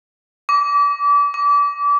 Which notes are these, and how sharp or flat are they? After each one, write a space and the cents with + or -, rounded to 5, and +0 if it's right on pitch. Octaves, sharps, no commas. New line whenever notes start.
D6 -30
D6 -30